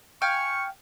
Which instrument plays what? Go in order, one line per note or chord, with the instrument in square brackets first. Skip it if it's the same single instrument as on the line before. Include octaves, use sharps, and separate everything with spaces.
[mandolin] F5 G5 G#5 [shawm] C#6